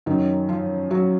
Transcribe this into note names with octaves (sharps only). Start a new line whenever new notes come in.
F#2 D#3 F#3 D#4
F3 F4
F#3 F#4